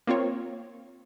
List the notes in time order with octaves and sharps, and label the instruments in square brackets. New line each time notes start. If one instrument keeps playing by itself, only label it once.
[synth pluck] A#3 C4 F4 C#5